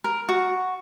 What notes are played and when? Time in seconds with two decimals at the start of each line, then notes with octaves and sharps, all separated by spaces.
0.04 A#4
0.29 F#4